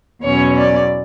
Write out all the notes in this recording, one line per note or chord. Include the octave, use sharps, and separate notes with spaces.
E2 B2 F#3 C#4 C#5
D5